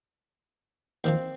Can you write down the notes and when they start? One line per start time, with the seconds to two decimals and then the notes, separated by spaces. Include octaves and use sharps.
1.04 D#2 D#3 F3 C4